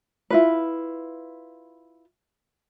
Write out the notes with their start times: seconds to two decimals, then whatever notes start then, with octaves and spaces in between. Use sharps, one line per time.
0.30 E4 F4 B4